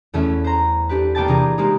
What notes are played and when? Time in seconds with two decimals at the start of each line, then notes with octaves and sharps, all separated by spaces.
0.14 E2 A3 C#4 E5
0.44 C5 A#5
0.89 A3 D4 G4 B4
1.15 A#3 B3 D5 G5 A5 A6
1.28 C3 E3 D4 F4 G#4 A#4
1.58 G3 G#3 A#3 C4 D#4